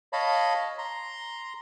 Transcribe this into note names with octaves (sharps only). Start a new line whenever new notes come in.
C#5 D#5 F5 A5 B5
A#5 C6